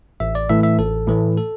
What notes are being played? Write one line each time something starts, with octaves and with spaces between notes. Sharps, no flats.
A1 E5
D5
A2 E3 A3 E5
E5
A1 A4
A2 E3 A3
A4